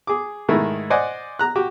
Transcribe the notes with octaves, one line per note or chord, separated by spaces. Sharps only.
G#4 D6
G#2 D#3 A3 E4
C5 D5 D#5 F#5 G#5
A#5 F#6
F#4 G4 D6